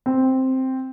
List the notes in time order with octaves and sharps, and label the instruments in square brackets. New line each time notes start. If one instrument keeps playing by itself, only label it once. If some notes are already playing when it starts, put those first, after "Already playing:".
[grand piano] C4